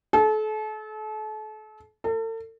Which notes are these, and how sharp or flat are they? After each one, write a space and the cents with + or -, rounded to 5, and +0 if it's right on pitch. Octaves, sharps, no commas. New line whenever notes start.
A4 -35
A4 +40